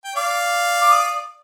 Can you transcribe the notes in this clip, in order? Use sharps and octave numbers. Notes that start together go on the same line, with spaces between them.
G5
D5 F5 D6
D6
D#6